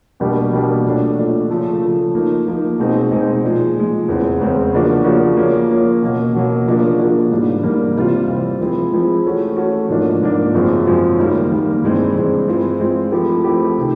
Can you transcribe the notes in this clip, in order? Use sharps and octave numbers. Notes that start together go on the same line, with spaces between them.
B2 G3 A#3 D4 G4
B2 G3 A#3 D4 G4
A#2 F#3 A3 D4
A#2 F#3 A3 D4
C#3 F3 A3
C#3 F3 A3
F3 A#3 D#4
F3 A#3 D#4
B2 G#3 C4 D#4 G#4
B2 G#3 C4 D#4 G#4
A#2 F3 G#3
A#2 F3 G#3
E2 C#3 E3 G#3 C4
E2 C#3 E3 G#3 C4
C#3 F3 A#3 D4 F#4
C#3 F3 A#3 D4 F#4
F3 A#3 C#4
F3 A#3 C#4
B2 F#3 A#3
B2 F#3 A#3
C#3 F3 A#3 D4 F#4
C#3 F3 A#3 D4 F#4
G#2 E3 G3 A#3 D4
G#2 E3 G3 A#3 D4
C3 E3 G3 C4 F4
C3 E3 G3 C4 F4
F3 G#3 C4 E4 G#4
F3 G#3 C4 E4 G#4
E3 A3 C#4 F#4
E3 A3 C#4 F#4
G#2 F3 A#3 D4
G#2 F3 A#3 D4
F#2 C#3 F3 G#3 C4
F#2 C#3 F3 G#3 C4
D#3 G3 A#3
D#3 G3 A#3
G2 E3 G#3 C4
G2 E3 G#3 C4
E3 G#3 C4 F4
E3 G#3 C4 F4
F3 A3 C4 E4 G4
F3 A3 C4 E4 G4
C3 D#3